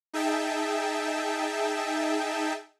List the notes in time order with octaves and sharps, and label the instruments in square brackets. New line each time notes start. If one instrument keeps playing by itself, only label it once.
[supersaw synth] D#4 G#4 E5 G5 A5